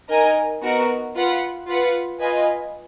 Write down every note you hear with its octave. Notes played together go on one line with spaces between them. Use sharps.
D#4 A#4 D#5 G#5
B3 D#4 F#4 A#4
F4 B4 F#5
F4 B4 F#5
F4 B4 D#5 G#5